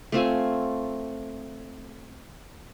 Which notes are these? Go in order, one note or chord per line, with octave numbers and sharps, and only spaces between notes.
A3 C4 F4 G#5